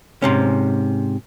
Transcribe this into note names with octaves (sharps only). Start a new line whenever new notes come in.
G#2 C3 C#4